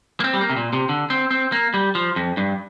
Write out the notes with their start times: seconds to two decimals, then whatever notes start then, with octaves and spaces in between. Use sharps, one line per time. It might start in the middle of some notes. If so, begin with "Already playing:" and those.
0.20 A#3
0.24 C4
0.34 G3
0.41 A#3
0.49 C3
0.57 A#2
0.73 C3
0.89 D3
1.10 C4
1.31 C4
1.52 A#3
1.74 G3
1.95 F3
2.16 F2
2.37 G2